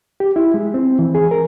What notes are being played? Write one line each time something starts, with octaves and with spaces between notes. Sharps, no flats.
G4
E4
G#3
C4
E3
G#4
A#4